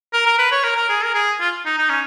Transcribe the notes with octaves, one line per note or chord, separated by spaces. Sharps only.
A#4
A#4
B4
C#5
A#4
A#4
G#4
A#4
G#4
F4
D#4
D#4
C#4